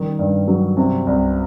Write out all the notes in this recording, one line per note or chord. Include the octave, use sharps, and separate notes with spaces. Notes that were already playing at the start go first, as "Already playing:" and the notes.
Already playing: D#3 G3
G2
F#3
C3
C2